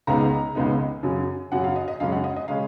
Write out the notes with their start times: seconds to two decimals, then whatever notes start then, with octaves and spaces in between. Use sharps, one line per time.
0.07 C#2 C#3 G#3 B3 D#4 A#5
0.55 C#2 C#3 G#3 B3 D#4
1.03 F#2 C#3 F#3
1.52 F#2 C#3 F#3 F#5
1.64 F5
1.76 D#5
1.88 D#5
2.00 F#2 C#3 G#3 C#4 F5
2.12 F#5
2.24 D#5
2.36 D#5
2.48 C#3 G#3 C#4 F5